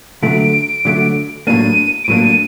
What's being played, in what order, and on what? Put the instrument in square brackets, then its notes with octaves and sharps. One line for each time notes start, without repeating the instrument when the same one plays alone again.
[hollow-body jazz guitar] D3 F#3 A3 [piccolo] D7
[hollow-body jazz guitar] D3 F#3 A3
[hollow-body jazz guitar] A2 F#3 A#3 D4 [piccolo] D#7
[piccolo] D7
[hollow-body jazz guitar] A2 F#3 A#3 D4 [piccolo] D#7
[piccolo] D#7